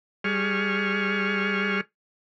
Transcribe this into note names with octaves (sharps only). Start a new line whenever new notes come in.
G3 G#4 C#6 F6